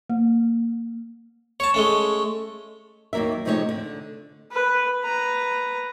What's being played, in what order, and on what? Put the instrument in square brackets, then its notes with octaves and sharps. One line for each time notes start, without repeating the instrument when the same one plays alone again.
[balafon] A#3
[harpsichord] C#5 A5
G#3 A3 C#4
[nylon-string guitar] D#2 F#3 A#3 A#4 E5
C3 F3 G#3 A3 D#4 C#5
D3
[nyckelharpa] B4
B4 A#5